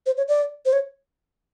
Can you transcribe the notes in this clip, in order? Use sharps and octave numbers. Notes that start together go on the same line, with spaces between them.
C5
C#5
D5
C5
C#5